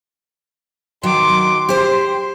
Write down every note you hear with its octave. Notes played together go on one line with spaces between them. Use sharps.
D#3 F#3 C6 D6
G4 C5 C6